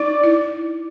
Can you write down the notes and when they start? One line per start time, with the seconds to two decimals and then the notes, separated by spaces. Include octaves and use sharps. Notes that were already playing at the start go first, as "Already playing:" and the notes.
Already playing: D#4 D5
0.24 E4